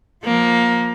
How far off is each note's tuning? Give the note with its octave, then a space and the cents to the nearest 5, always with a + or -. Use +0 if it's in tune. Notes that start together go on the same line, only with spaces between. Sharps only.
F3 +20 A#3 +15